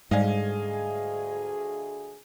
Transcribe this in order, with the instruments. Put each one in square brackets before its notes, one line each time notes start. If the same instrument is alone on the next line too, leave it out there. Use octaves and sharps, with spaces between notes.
[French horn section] D2 G#4 [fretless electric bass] G#2 [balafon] G3 D5 [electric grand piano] D#5 F5 G#5